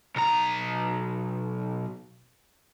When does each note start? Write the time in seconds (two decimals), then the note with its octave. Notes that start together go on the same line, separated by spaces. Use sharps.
0.16 B1 A#5